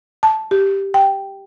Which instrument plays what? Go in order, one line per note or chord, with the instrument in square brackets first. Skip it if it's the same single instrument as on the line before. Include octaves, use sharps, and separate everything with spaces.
[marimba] A5
G4
G5